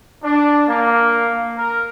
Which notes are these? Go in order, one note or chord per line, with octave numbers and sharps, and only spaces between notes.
D4
A#3
A#4